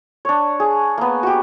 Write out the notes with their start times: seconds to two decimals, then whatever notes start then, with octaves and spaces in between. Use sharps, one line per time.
0.25 D4 C#5
0.60 G#4
0.98 A#3 B3
1.23 F#4 G4